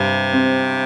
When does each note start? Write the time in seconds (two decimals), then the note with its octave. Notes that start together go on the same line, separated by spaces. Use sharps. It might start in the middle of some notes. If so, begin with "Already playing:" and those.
Already playing: G2 C3
0.33 C4